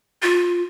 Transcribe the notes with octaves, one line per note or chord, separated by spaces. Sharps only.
F4